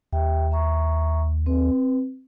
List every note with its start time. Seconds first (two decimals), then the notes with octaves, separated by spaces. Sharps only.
0.12 D#2 G4 E5 G5
0.51 E5 A#5 C#6
1.46 C4 B4